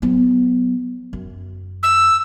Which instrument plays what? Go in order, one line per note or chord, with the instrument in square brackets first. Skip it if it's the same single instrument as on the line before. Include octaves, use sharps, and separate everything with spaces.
[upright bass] F#3 B3
F#2
[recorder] E6